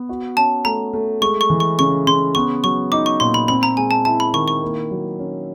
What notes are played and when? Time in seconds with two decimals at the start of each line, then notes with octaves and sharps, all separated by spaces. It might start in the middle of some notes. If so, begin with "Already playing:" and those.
Already playing: B3
0.09 F#4
0.37 C#4 A5
0.65 A3 A#5
0.93 A3
1.21 G#3 C#6
1.41 C#6
1.50 E3
1.60 C#6
1.79 C#3 C#6
2.07 C#3 C6
2.35 B3 C#6
2.64 F#3 C#6
2.92 D#4 D6
3.06 C#6
3.20 A#2 C6
3.34 B5
3.48 C4 B5
3.63 A#5
3.77 G#3 G#5
3.91 A5
4.05 E4 A5
4.20 B5
4.33 D#3 C#6
4.48 C#6
4.63 A#3
4.91 F#3
5.19 C#4